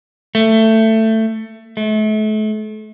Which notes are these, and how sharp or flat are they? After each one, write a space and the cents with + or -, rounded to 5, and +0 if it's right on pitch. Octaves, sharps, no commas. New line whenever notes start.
A3 +15
A3 -35